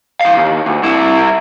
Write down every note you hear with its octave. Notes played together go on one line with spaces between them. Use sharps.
E3 F5
D#2
D2
C2 E4